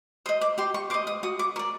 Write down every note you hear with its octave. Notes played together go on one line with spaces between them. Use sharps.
C5 D#5 D#6
D6
G4 C6
C#6
C5 D#5 D6
D#6
F#4 D#6
D6
A#4 D5 C#6